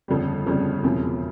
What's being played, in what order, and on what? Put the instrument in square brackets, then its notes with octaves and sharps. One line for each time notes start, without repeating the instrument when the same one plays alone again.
[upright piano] G1 F2 C#3 G3
G1 F2 C#3 G3
E1 E2 C#3 F3 C4